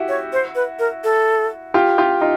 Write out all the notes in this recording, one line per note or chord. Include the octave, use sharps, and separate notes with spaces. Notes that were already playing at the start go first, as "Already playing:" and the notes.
Already playing: E4 F#4 G4
C#5
C5
B4
A#4
A4
F4 G4
F4 G4
D#4 F4